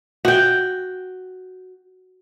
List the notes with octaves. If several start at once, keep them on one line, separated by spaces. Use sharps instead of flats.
F#4 G5